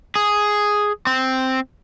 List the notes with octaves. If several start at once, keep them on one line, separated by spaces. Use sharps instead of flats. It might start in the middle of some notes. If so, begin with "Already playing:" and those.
G#4
C4